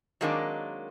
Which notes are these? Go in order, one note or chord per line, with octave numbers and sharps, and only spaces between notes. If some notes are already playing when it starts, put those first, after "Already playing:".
D#3 F#3 G#3 A#3 C4 D4